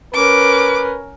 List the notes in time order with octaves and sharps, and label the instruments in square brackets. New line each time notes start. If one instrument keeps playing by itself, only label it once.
[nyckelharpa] C#4 A#4 [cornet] B4 [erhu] D6